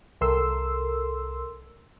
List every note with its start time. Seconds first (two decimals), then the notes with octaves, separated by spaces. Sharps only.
0.21 C2 A4 A#4 C6 E6